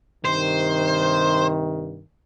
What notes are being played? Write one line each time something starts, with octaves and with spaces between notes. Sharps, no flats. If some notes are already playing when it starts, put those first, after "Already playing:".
G2 C3 D#3 C5